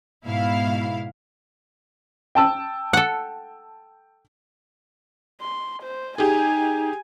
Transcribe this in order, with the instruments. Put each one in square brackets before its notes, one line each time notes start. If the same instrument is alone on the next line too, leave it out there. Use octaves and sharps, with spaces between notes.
[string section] G#2 B2 E4 F5
[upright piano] G5 A5 E6
[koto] A4 F#5
[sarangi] C6
C5
[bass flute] D#4 [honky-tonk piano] G4 G#4 [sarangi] G#5